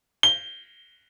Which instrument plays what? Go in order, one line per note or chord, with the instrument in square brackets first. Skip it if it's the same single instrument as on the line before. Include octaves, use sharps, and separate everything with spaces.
[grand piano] G7